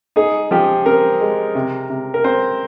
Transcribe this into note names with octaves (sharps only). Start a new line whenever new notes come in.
D#4 G#4
F3 G4
C4 A#4
G#3
C3
C3
A#4
C4 C5